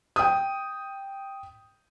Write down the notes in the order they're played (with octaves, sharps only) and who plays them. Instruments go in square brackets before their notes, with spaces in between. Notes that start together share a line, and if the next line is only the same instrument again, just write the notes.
[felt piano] G5 D#6